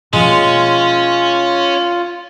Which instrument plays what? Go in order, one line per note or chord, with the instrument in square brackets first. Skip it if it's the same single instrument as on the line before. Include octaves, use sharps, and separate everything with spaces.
[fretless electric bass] B2 F3 A#3 [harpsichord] G#3 [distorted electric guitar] C#4 [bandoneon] F4